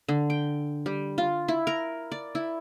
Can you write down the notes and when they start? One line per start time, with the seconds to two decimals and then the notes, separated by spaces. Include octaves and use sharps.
0.08 D3
0.30 G5
0.86 G3
1.18 F4
1.48 E4
1.67 A#4
2.12 D5
2.35 E4